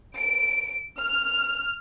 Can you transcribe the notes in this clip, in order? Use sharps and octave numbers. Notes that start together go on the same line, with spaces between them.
D7
F6